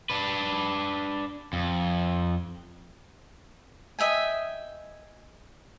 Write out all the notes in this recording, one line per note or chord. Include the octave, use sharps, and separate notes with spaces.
D4 B4
F2
D#5 E5 G5 G#5